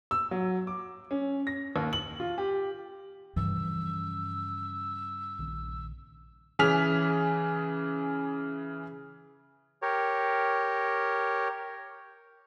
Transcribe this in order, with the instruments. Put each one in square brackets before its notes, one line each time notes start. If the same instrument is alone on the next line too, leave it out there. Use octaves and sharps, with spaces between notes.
[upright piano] E6
F#3
D6
C#4
A#6
D#2
F#7
F4
G4
[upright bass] G2 C#3 [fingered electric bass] E3 F3 [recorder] E6
[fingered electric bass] A#1 D#3
[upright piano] C#3 E3 G#4 F6 B6 F7
[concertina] G4 A#4 C#5